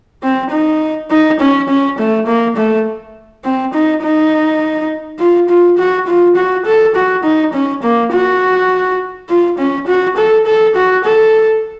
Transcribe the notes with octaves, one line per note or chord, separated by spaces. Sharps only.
C4
D#4
D#4
C#4
C#4
A3
A#3
A3
C4
D#4
D#4
F4
F4
F#4
F4
F#4
A4
F#4
D#4
C#4
A#3
F#4
F4
C#4
F#4
A4
A4
F#4
A4